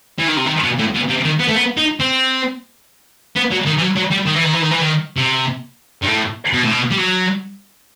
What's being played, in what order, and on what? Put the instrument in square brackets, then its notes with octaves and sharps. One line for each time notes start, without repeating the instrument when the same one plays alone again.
[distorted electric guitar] E3
D#3
C3
D#3
B2
A2
B2
C3
D#3
B3
A3
B3
D#4
C4
B3
F#3
D#3
E3
F#3
F#3
G3
D#3
E3
D#3
E3
D#3
E3
D#3
C3
G2
A2
B2
A2
B2
G3
F#3